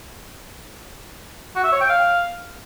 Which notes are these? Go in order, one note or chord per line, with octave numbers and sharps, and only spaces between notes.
F#4
E5
C#5
G5
F5